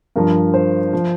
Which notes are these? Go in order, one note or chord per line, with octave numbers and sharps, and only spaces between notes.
G2 F3 A#4
C5
F3